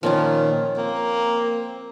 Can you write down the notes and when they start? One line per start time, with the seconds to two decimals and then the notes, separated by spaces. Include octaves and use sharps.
0.03 A#2 D#3 F3 C#4 F4
0.77 A#3 C4